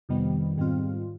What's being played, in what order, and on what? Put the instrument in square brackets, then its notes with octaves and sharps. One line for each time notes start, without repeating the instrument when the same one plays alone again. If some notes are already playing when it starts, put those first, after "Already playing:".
[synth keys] F2 C3 D#3 G3 B3
G#2 D#3 G3 C4 F4